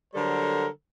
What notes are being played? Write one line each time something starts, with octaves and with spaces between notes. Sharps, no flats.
D3 F#3 G3 A4 A#4 C5